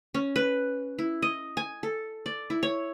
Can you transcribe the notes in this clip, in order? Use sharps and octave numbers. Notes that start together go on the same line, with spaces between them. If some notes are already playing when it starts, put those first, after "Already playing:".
C#4
B4
E4
D#5
G#5
A4
D5
E4
C#5